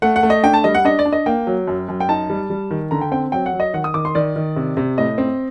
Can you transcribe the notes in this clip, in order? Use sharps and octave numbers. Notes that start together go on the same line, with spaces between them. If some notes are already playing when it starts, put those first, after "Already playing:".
A3 F#5
F#5
A3
D#5
D4 G5
A5
G3 D#5
F#5
D4 D#5
D5
D4
D#5
A#3 G5
F#3
F#2
F#2
G5
D#4 A5
G3
G3
D#3
D3 A#5
G5
C4 G5
F#3 G5
F#5
F#3
D#5
D#3 F#5
D#6
D#3 D6
C6
D#3 D5
D#3
C3
C3
A2 D#5
C4